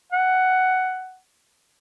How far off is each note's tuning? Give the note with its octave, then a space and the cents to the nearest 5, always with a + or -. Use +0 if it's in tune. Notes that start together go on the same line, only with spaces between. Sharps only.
F#5 +10